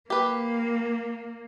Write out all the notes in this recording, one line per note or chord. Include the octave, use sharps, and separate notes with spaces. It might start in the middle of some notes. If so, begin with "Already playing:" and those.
A#3 G4 B4